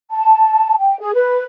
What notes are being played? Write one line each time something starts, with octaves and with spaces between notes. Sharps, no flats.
A5
G5
G#4
B4